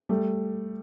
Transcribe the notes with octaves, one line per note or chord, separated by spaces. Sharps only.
G3 A3